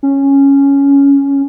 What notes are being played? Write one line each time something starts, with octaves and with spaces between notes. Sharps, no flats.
C#4